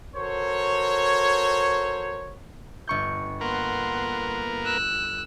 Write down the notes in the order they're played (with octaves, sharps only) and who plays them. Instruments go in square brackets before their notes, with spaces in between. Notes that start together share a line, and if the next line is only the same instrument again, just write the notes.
[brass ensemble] F#4 A4 A#4 C5 C#5
[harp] G1 C#6 G6
[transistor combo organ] A#3 B3 A#4 [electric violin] F#5 C6
[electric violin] E6 F#6